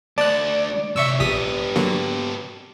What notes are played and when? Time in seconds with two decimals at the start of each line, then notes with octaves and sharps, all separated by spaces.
0.18 D2 D5 A5 F#6
0.96 C3 C#5 E5 C#6 E6
1.20 A#1 B3 G4 D#6 B6
1.76 D3 F#3 A#3